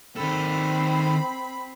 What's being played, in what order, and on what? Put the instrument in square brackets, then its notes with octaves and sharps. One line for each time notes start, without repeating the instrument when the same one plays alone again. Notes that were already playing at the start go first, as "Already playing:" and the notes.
[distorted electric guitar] D#3 A4 [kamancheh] C4 [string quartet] B5